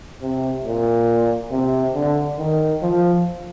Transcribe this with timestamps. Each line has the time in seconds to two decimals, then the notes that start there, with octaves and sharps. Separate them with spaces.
0.21 C3
0.64 A#2
1.51 C3
1.94 D3
2.38 D#3
2.82 F3